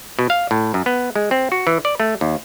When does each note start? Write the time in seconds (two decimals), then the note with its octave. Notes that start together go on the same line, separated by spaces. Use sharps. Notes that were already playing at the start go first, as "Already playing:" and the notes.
0.19 B2
0.30 F5
0.51 A2
0.74 F#2
0.86 B3
1.16 G#3
1.31 C4
1.52 F#4
1.67 E3
1.85 D5
2.00 A3
2.21 D#2